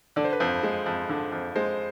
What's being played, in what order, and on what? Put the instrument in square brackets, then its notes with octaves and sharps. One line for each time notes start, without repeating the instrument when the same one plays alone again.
[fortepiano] D3 [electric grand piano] D5
[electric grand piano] C5
B4
[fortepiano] F2 [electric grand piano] C5
[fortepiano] G#3
F2
D3
F2
[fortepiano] G#3 [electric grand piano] C5